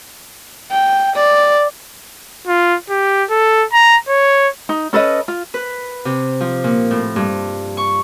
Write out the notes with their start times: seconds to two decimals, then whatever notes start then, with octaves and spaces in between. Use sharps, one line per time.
0.72 G5
1.16 D5
2.47 F4
2.90 G4
3.30 A4
3.73 A#5
4.08 C#5
4.69 D#4
4.93 C#4 A4 B4 D#5
5.28 F4
5.54 B4
6.05 C3
6.41 F3
6.64 A#2
6.91 A2
7.16 G2
7.77 C#6